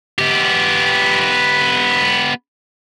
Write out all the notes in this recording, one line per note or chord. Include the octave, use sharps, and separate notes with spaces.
B3 G4